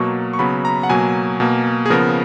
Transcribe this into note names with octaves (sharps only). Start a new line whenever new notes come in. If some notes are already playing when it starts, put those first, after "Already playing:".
Already playing: B2 F#3 A#3 C#6
C#6
C#3 F#3 B3 B5
A#5
F#5
B2 F#3 A#3 G#5
B2 A#3
G#4
C#3 F3 B3 A#4